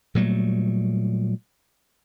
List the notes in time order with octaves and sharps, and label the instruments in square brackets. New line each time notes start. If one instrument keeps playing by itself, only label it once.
[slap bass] A#2 F#3 G3 A3